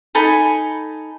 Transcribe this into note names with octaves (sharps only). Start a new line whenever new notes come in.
D#4 A4 G#5 B5